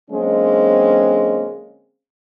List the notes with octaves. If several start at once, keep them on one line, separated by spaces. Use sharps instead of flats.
D3 F#3 G#3 A#3 C4 C#4